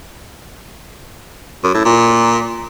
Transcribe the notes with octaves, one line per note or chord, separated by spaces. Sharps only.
F#2
A2
A#2